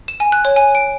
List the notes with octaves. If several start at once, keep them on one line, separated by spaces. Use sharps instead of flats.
E7
G#5
F#6
C#5
G#5
D7